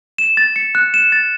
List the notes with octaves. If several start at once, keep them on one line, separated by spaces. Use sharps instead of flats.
E7
A6
C#7
F#6
E7
A6